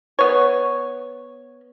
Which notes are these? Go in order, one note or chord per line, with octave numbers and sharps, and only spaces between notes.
B3 C#5